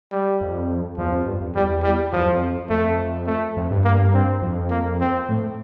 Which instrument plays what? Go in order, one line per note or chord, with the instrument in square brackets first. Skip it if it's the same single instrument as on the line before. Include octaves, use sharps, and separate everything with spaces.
[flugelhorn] G3
[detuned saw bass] F2
[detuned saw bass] E2 [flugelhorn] F3
[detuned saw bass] F2
G2
F2
[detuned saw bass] E2 [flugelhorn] G3
[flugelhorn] G3
[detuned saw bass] E2 [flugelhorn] F3
[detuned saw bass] F2
[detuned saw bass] F2 [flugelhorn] A3
[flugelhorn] A3
[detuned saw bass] F2
G2
[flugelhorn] A#3
C4
[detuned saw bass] F2
[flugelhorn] A#3
C4
[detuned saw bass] A2